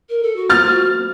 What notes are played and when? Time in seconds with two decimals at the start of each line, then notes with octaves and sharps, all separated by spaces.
0.09 A#4
0.23 A4
0.36 F#4
0.50 F4 F6 A6
0.68 F#4